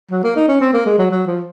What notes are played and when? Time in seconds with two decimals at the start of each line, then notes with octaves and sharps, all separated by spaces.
0.11 F#3
0.24 A#3
0.36 D#4
0.48 C#4
0.61 C4
0.73 A#3
0.86 G#3
0.98 F#3
1.11 F#3
1.27 F3